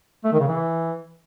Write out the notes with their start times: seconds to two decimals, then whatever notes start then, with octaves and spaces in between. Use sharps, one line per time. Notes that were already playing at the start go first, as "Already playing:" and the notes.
0.24 A3
0.32 D#3
0.40 C#3
0.48 E3